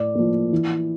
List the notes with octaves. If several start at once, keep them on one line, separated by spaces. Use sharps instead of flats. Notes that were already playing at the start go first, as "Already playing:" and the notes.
Already playing: A2 D5
F3 A#3
E3